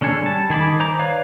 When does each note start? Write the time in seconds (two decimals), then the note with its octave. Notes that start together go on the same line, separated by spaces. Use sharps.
0.01 D3 C#4 D4 G#4 A4
0.22 G3 A5
0.50 D#3 G#4 B5 D6
0.80 C5 A#5 D6
0.99 B4 C#5 D5 F5